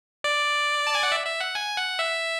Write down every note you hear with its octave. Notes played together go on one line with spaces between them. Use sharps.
D5
A5
G#5
F#5
E5
E5
F#5
G#5
F#5
E5